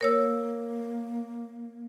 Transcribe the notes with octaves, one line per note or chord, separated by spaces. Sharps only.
A#3 A#4 C#5 E6